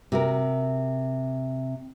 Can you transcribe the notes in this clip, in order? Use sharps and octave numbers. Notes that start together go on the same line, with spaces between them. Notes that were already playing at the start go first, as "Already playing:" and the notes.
C3 F#4 A#4